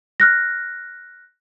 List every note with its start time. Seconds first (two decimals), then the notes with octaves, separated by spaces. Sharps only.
0.20 F6 F#6 A#6